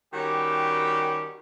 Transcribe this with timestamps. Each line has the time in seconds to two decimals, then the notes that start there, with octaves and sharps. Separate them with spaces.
0.14 D#3 G3 C#4 F#4 G4